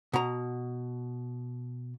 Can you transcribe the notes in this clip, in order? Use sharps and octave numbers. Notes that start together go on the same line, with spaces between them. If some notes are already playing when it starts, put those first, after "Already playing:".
B2 A#5